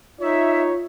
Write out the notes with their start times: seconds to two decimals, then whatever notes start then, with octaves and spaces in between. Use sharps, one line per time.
0.20 D#4 F4 C#5 E5